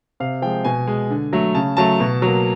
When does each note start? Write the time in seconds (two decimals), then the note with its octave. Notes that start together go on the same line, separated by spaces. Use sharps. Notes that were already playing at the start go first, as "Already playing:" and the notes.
0.20 C3 F5
0.42 F3 G#3 G5
0.65 B2 G#5
0.87 G#3
1.11 D3
1.33 F#3 A3
1.55 C#3 A5
1.77 F#3 A3 A5
2.00 B2
2.22 F#3 A#3